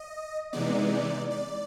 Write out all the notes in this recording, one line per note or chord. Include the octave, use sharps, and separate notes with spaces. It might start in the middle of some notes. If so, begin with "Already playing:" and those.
Already playing: D#5
C3 E3 G#3 B3 D#4 D5
D5